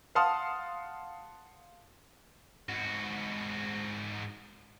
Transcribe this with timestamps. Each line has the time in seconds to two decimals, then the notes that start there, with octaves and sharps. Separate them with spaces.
0.15 F5 F#5 A5 C6 D#6 F6
2.69 G#2 F#4